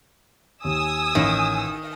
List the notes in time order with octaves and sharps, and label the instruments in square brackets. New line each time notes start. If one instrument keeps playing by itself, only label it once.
[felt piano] D#2 [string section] G#5 D#6 E6
[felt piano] A1 C#5 F5 [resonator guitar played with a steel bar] D#3